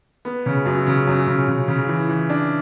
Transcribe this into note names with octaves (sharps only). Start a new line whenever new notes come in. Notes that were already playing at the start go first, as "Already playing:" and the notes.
B3
C#3
F#2
C#3
F#2
C#3
C#3
C#3
E3
E3
D4